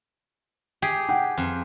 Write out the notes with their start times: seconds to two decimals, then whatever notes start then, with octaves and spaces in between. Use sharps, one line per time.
0.82 G4 G#4
1.09 F#5 G5
1.38 F2